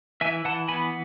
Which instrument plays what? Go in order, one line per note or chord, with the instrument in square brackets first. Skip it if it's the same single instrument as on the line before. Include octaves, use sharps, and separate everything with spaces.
[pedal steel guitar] E3 E5 G#5
E3 F#5 A5
B3 G#5 B5